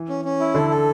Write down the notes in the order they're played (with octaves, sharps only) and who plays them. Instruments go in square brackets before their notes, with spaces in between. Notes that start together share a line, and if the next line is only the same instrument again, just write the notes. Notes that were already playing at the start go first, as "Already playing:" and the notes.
Already playing: [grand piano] E3
[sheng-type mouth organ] C#4
C#4
E4
[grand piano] D3 [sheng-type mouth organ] A4
[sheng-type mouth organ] A4